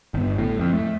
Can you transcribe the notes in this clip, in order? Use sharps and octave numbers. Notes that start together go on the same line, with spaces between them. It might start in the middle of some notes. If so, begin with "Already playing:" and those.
G1
A2
F2
A3